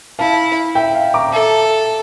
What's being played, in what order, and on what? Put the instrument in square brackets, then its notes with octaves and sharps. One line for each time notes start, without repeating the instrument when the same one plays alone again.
[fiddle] E4 [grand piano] F5 A5
[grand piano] E5 G5
F5
A#5 D6
[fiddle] A4 [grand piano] E5